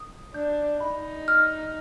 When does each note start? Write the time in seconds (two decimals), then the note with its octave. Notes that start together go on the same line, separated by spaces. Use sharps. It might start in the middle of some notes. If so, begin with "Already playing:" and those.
Already playing: D#6
0.34 D4 G6
0.80 D#4 B5
1.28 F6